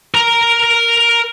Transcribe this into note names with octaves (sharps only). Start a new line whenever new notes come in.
A#4 A#5